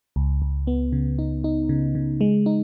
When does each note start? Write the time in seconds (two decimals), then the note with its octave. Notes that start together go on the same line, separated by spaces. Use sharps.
0.16 C#2
0.42 C#2
0.67 B3
0.92 C#3
1.19 D#4
1.44 D#4
1.69 C#3
1.95 C#3
2.21 G#3
2.46 D#4